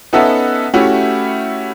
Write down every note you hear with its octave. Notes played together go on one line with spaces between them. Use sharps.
B3 C#4 D#4 A4 E5 F#5
A3 C#4 E4 F#4 G4